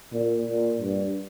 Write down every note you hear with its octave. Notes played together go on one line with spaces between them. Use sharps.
A#2
A#2
G2